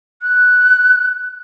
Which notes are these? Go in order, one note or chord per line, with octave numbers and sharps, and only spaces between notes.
F#6